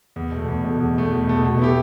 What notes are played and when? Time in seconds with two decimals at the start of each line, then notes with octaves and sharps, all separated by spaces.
0.16 E2
0.31 B2 A3
0.48 E2
0.64 B2 A3
0.80 E2
0.95 B2 A3
1.11 E2
1.27 B2 A3
1.43 B2
1.59 B3 E4 G4